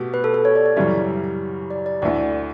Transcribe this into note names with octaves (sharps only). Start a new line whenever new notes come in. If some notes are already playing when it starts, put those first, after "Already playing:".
Already playing: B2 A3 G4
B4
A4
A4
C#5
D5
D5
F#2 C#3 E3 G3 C#4 E5
D5
D5
D2 D3 A3 E4 D5